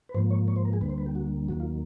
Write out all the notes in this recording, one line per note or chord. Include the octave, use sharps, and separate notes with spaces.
B4
G#2 F3 A#3 C5
C#5
C#5
C5
A#4
G#4
D2 D3 G3 A#3 B4
C5
B4
G4
F#4
D#2 D#3 F#3 A#3 F#4
F4